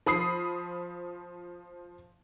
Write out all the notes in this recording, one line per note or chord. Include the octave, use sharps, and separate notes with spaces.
F3 B5 D#6 C7